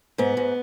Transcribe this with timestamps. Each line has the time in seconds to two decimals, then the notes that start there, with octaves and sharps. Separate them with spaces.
0.18 G#2 B3
0.37 G#2